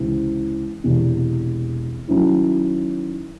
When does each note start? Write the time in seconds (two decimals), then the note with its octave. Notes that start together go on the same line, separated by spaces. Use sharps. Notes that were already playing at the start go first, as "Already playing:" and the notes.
Already playing: C#2 C3 E3 C4
0.84 E1 E2 C3
2.08 D#3 F#3 C#4 E4